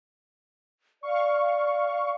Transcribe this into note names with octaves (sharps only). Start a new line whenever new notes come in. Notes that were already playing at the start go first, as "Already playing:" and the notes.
D5 F5 C#6